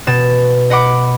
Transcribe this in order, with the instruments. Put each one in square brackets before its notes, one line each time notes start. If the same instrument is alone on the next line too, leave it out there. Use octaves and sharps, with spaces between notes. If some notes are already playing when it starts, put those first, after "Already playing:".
[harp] B2 A6 E7
D#5 F#5 B5 D6 D7